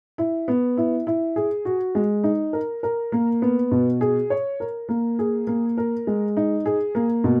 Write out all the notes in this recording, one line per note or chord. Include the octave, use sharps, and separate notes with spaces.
E4
B3
E4
E4
G#4
F#4
G#3
D#4
A#4
A#4
A#3
B3
B2
G#4
C#5
A#4
A#3
G#4
A#3
A#4
G#3
D#4
G#4
A#3
B2